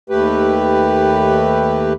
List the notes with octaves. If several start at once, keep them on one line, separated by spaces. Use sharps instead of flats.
D#2 A3 G4 B4